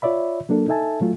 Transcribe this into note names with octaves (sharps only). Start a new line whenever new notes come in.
F4 C#5 D5 E5 B5
F#3 A#3 D4 A4
D#4 A4 E5 G#5 A5
F#3 A3 F4